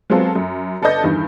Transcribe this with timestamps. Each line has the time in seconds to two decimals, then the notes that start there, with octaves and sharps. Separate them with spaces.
0.10 F#3 G#3 B3 C4 F4 A4
0.35 F#2
0.82 G1 A4 B4 D5 D#5 G6
1.04 E2 G2 D#3